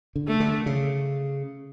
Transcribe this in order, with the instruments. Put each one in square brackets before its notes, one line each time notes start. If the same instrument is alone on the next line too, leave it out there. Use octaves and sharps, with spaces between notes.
[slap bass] D3
[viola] A3
[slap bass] D3
C#3